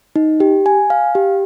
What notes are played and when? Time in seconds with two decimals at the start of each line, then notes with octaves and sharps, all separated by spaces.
0.16 D#4
0.40 G4
0.66 G#5
0.90 F5
1.15 G4